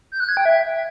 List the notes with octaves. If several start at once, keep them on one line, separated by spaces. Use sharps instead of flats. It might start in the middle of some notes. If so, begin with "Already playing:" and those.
G6
F#6
G#6
G5
E5